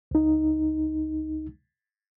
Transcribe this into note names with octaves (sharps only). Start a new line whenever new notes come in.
C#2 D#4